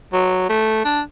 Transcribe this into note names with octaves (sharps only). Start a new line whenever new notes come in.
F#3
A3
D4